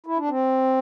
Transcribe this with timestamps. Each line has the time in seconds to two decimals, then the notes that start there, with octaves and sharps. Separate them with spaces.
0.06 E4
0.18 D4
0.29 C4